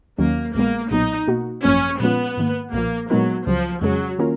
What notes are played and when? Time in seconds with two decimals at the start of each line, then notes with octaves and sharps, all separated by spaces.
0.18 D#2 D#3 F#3 A#3 C#4
0.55 A#1 A#2 G#3 A#3 B3
0.91 B1 A#2 F#3 B3 D#4
1.27 B2 A#3 D#4 F#4
1.64 G#1 F#2 F3 A#3 C#4
2.00 A#2 F3 G#3 B3 C#4 F4
2.37 G#2 D#3 A#3
2.73 B1 A#2 F3 A#3
3.09 A#2 F#3 G#3 B3 D#4 A#4
3.46 C#2 C#3 F3 F#3
3.82 F2 C#3 F#3 G#3 C#4 G#4
4.19 D#3 A#3 C#4 F4 A#4